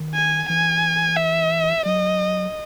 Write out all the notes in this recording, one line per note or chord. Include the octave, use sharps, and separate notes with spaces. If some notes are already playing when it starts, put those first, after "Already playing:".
Already playing: D#3
G#5
E3 G#5
E5
F#3 D#5